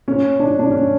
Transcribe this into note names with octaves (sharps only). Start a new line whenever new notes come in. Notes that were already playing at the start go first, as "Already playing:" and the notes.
C#4
D4
D4
C#4